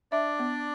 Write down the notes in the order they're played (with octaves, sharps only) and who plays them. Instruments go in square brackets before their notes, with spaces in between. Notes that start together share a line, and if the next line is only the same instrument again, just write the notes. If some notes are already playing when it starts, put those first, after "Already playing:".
[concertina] D4 D5 [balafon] E5
[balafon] B3